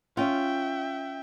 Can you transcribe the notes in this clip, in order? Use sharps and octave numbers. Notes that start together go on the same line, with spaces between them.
C#4 F4 E5 G5